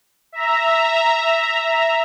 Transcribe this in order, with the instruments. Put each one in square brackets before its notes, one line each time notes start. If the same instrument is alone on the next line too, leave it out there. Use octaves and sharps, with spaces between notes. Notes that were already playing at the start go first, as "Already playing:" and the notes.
[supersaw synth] E5 A#5